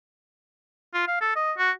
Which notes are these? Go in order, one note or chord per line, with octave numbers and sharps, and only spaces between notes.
F4
F5
A4
D#5
F#4